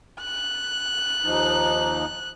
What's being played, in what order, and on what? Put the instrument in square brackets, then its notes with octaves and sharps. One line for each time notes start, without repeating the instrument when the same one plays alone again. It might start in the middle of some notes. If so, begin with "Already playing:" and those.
[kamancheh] F#6
[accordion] D#2 F3 D#4